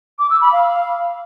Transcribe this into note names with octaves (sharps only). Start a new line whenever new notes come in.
D6
E6
B5
F5